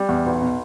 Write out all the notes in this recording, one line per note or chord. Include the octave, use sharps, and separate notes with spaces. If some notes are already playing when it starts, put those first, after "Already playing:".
Already playing: G3
E2
B1
B2